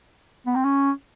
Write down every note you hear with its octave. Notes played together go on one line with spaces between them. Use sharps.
B3
C4
C#4